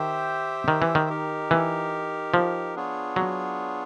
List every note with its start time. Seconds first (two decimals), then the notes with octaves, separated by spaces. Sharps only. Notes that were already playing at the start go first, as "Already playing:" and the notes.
Already playing: D#3 G4 C5 E5 G5
0.68 D#3
0.82 E3
0.95 D#3
1.10 D#4 G4 A#4
1.51 E3
2.34 F3
2.76 B3 D4 F4 G#4 C#5
3.16 F#3